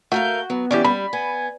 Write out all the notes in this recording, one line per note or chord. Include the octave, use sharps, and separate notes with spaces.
A3 F#4 A#4 F5 G6
F#3 B3
E3 G3 C#4 G4 D5
G3 B5
B3 G#5